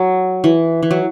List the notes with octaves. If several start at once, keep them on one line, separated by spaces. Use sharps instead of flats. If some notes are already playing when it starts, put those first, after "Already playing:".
Already playing: F#3
E3
E3
F#3